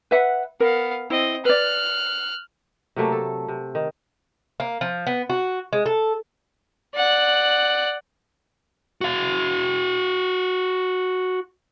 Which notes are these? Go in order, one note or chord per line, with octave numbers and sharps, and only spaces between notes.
B4 E5 F#5
B3 A#4 F5
C4 E4 D#5
B4 D5 F6 F#6
C3 F#3 A3 A#3
A4
C3
D#3
A#3
F3
B3
F#4
G#3
A4
D5 F#5
F#4 F5